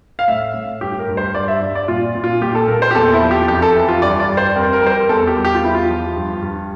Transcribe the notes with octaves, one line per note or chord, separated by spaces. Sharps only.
F5
A2 E5
A2
G2 G4
A#4
G2
C5
G2 D5
E5
G2 E5
D5
A#2 F4
A#2
F4
A#2 G4
A4
A#2 A#4
C5
G4
E2 A4
E4
F3
G4
F2 G4
A4
E3
F4
G2 D5
D5
G3
C5
F2 A#4
A#4
G3 C5
A#4
E2 A4
G4
G3
G4
F4
E2 E4
F4
F3
G2
G2